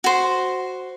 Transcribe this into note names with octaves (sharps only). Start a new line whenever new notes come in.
F#4 C5